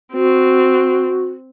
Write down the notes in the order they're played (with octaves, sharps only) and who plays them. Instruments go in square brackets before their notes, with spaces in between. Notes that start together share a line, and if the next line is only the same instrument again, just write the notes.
[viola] C4 [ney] F#4